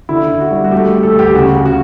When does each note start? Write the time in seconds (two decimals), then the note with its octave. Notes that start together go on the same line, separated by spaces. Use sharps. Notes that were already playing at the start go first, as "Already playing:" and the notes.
0.09 D3 E4
0.30 D3
0.40 F#4
0.51 G3
0.64 F#4
0.71 A3 G4
0.93 A3
1.03 A4
1.14 D2
1.19 G4
1.34 C#3 F#4
1.55 C#3
1.66 F#4